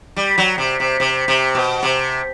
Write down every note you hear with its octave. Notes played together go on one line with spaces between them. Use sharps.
G3
F#3
C3
C3
C3
C3
B2
C3